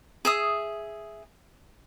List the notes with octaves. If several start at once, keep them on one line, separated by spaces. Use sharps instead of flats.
G#4 E5 D#6